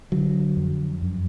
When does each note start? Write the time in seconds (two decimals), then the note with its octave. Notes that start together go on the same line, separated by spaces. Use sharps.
0.12 D3 F#3
0.57 F2
1.02 F#2